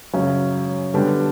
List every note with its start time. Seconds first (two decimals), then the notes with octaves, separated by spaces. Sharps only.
0.13 F#2 C#3 F#3 C#4
0.94 D3 G3 B3 D4 G4